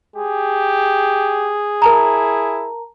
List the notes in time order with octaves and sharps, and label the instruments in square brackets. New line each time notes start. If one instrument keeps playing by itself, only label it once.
[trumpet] G4 [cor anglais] G#4
[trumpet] E4 [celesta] A#4 A5 A#5